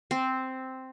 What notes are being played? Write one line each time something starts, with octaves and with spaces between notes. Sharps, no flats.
C4